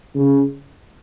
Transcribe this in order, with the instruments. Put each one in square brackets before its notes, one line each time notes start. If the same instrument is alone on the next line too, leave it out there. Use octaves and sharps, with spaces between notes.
[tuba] C#3